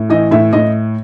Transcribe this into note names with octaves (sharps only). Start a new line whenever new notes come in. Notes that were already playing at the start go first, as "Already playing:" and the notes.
Already playing: A2
E3 D#5
A2 E5
A2 D#5